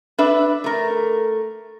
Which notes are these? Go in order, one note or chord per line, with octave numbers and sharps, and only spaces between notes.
D4 B4 E5
A3 A#4